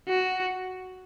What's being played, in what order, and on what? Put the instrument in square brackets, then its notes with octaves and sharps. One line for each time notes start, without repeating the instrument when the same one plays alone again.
[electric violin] F#4